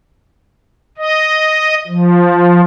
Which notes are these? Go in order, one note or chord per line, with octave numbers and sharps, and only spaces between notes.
D#5
F3